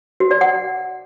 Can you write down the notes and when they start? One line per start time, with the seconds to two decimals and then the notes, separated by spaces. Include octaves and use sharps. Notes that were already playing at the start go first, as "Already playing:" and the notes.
0.20 F#4
0.31 D5
0.41 F#5